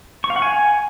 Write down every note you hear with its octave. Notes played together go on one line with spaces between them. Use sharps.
C#6
F5
F#5
G#5